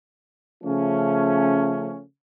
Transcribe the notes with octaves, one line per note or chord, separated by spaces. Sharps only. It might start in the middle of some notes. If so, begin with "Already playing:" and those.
C#3 F3 A3 C#4